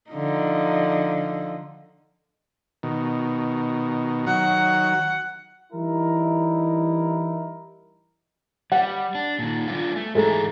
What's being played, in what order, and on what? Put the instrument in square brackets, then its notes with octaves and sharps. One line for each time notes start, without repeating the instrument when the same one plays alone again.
[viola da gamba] D3 F3 D#4
[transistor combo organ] B2 D#3
[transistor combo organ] D#3 F#3 [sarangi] F#5
[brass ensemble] E3 G3 D#4 E4 A#4
[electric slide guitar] G3 [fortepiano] F#5
[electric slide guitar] D4
A#2 D#3
G3 D4 F4
A3
[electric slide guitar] G#2 E3 A#5 [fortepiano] G#3 A3